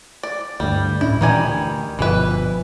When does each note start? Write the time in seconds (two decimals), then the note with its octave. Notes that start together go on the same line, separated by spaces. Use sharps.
0.23 D5
0.60 D2 G2 G3
1.01 A2 C#4 D4 E4
1.21 A#2 D#3 E3 G3 G#5
1.33 D2
1.99 G1 B2 E3 F3 B4